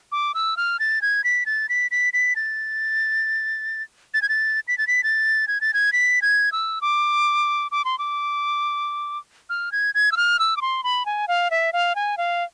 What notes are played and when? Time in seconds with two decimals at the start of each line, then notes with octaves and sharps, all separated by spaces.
0.12 D6
0.35 E6
0.57 F6
0.80 A6
1.02 G#6
1.24 B6
1.46 A6
1.69 B6
1.91 B6
2.13 B6
2.36 A6
4.14 A6
4.22 G#6
4.29 A6
4.68 B6
4.78 A6
4.87 B6
5.04 A6
5.48 G#6
5.61 A6
5.74 G#6
5.93 B6
6.22 G#6
6.52 E6
6.82 D6
7.71 D6
7.85 C6
7.99 D6
9.50 F6
9.72 G#6
9.95 G#6
10.12 E6
10.17 F6
10.39 E6
10.57 D6
10.61 C6
10.84 B5
11.06 G#5
11.28 F5
11.51 E5
11.73 F5
11.96 G#5
12.18 F5